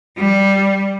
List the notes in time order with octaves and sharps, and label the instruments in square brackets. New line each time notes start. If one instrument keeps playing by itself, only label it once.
[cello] G3